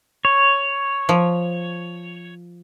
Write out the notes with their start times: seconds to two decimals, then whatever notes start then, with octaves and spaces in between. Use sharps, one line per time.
0.25 C#5
1.09 F3